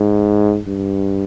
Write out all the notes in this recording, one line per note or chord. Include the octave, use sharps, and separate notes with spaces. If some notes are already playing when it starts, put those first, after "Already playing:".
Already playing: G#2
G2